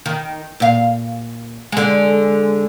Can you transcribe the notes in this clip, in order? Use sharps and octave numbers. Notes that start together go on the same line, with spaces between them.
D#3
A#2 F5
D3 G#3